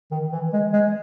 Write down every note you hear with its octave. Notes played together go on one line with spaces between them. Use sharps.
D#3
E3
G#3
G#3